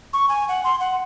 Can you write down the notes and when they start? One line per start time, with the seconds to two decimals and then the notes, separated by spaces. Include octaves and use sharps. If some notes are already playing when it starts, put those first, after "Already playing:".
0.13 C#6
0.29 G#5
0.48 F#5
0.64 C6
0.80 F#5